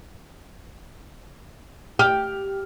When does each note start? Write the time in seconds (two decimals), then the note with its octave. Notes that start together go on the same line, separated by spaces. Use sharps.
1.99 G4 F6